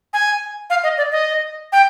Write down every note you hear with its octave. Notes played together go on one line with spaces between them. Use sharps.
G#5
F5
D#5
D5
D#5
G5